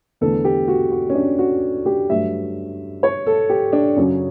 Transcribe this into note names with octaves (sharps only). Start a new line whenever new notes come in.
E2 D3 A3 A4
G4
F#4
F#4
C#4
D4
F#4
G4
G2 F#3 A3 E5
C#5
A4
G4
D4
F#2 C#3 F#3 C#4